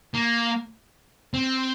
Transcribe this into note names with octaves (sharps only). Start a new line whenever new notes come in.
A#3
C4